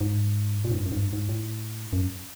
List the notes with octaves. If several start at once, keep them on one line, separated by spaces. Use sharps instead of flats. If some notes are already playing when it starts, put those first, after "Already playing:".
G#2
A#2
G#2
G2
F#2
G#2
G2
G#2
A2
F#2